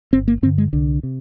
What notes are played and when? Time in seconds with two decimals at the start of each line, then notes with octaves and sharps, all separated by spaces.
0.13 G1 C4
0.28 A#3
0.42 G2 D3 C4
0.58 G#3
0.73 C2 D3
1.03 C3